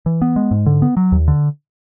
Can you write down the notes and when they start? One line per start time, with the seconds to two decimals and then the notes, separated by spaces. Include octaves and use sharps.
0.06 E3
0.22 B3
0.36 G#3
0.51 G#2
0.66 D3
0.82 B3
0.97 F#3
1.12 D#2
1.28 D3